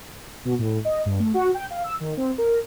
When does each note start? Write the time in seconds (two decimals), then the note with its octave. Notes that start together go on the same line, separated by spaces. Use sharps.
0.45 B2
0.59 A2
0.85 D#5
1.06 G2
1.19 A3
1.34 F#4
1.54 G5
1.70 F5
1.84 E6
2.00 D#3
2.17 C4
2.38 A#4